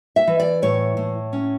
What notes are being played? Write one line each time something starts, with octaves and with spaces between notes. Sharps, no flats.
E5
E3
D5
A2 C#5
A2
C#4